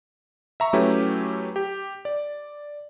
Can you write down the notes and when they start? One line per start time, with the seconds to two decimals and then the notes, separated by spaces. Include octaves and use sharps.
0.60 E5 A#5 C#6
0.73 F#3 A3 C#4 E4 G4 B4
1.56 G4
2.05 D5